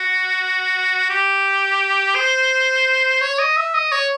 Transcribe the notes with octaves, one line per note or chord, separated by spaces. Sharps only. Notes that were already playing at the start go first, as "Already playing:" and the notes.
Already playing: F#4
G4
C5
C#5
D#5
E5
D#5
C#5